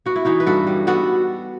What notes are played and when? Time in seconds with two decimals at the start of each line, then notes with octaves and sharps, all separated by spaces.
0.06 B3 F#4
0.16 E4
0.25 E3 D#4 F#4
0.40 B4
0.46 G2 F#4 A4
0.67 G3
0.87 B3 F#4 A4